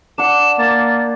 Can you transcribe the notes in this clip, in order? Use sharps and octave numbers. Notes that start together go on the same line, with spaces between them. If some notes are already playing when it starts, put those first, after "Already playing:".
D4 F#5 E7
A#3 A6